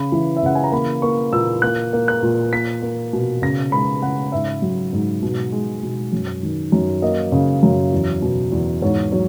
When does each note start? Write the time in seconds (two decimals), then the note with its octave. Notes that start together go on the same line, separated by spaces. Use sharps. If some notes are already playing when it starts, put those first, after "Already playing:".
Already playing: C#3 B5
0.12 E3
0.37 E5
0.43 C#3 F#5
0.55 G#5
0.64 A#5
0.72 A#3 B5
1.02 A#3 C#6
1.33 A#2 E6
1.62 A#3 F#6
1.93 A#3
2.08 F#6
2.23 A#2
2.53 A#3 B6
2.82 A#3
3.13 B2
3.42 C#3 A#6
3.72 G#3 B5
4.02 C#3 F#5
4.32 G#2 E5
4.62 F#3
4.93 G#2
5.23 B2
5.52 G#3
5.83 B2
6.12 F#2
6.43 D#3
6.72 F#2
7.02 A#3 D#5
7.32 C#3
7.63 F#2
7.93 E2
8.22 B2
8.52 E2
8.82 G#2 C#5
9.12 F#3 C#5